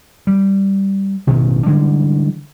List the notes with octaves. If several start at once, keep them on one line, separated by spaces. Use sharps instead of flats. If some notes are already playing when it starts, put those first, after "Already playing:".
G3
A1 G2 B2 D#3
D3 E3 G3 G#3